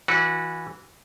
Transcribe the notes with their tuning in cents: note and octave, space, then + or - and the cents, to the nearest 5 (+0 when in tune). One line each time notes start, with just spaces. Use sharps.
E3 +0 F#4 -20 B4 -35